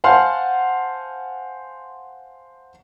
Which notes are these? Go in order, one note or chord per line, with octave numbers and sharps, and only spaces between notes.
C5 F5 F#5 G#5 A5 C6